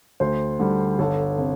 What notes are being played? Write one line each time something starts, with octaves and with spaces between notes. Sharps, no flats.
D2 C5
D3 G3
G1 A4
C3